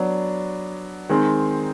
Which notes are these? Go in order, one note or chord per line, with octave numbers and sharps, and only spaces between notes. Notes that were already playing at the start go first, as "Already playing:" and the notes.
Already playing: F#3 B3 D4
D#3 G#3 C4